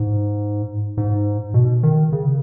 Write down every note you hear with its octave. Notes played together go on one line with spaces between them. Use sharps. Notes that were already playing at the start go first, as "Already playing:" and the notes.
Already playing: G#2
G#2
B2
D#3
C#3